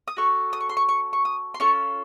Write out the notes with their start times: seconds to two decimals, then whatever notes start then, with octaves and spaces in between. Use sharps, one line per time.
0.08 D#6
0.17 C#4 F#4 A4 C#6
0.53 D#6
0.60 C#6
0.69 C6
0.77 C#6
0.89 C#6
1.13 C#6
1.25 D#6
1.54 C6
1.60 C#4 F4 A4 C#6